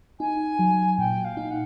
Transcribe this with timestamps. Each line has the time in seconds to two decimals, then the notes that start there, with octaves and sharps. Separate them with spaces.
0.20 D#4 G#5
0.59 F#3
0.98 A#2 G5
1.24 F5
1.37 D#4
1.51 F#5